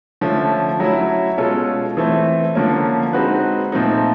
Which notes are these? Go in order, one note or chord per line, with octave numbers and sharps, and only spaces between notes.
D3 F3 A3 C#4
F#3 A3 C#4 E4
B2 G#3 C#4 F4 A4
E3 A3 C4
D3 F3 A#3 C#4
G#3 C4 D#4 F#4 B4
A#2 F3 A3 C4 D#4